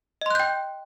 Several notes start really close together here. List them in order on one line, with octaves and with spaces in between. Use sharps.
D#5 C6 F#6 G6 G5